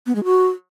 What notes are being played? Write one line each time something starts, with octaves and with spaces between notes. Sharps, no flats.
B3
G#3
F#4